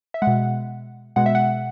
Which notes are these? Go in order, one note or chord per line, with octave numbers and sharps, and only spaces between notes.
E5
G#3 F#5
B2
B2 G#3 F#5
E5
F#5